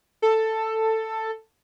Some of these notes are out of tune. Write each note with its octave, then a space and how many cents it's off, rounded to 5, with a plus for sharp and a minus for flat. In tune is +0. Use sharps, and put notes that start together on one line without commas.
A4 +10